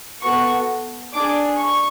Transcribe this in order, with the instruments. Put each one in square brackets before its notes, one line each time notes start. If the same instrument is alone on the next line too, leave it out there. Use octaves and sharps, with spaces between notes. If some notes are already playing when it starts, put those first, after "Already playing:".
[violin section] B3 F#4 A4 C#6
D4 G#4 D6
C#6